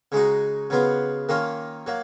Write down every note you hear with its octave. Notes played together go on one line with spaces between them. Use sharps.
C#3 G#3 D#4 F#4
C#3 F#3 B3 F4
D#3 A#3 C#4 F4
F#3 A#3